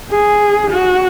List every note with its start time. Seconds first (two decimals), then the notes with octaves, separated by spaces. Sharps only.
0.10 G#4
0.71 F#4